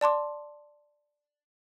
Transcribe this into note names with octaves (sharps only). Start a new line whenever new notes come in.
D5 A5 C6 D6